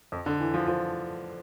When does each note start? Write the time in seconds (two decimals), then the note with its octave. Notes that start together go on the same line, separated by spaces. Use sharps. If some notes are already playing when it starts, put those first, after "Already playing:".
0.12 F2
0.26 D3
0.40 E3
0.54 F3
0.67 F3